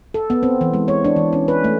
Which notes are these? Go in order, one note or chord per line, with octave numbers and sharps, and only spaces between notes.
A4
B3
C4
E3
G#3
C#5
D4
E3
C#4
B4
A3